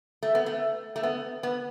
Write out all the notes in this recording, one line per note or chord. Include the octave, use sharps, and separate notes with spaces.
A3
B3
A3
A3
B3
B3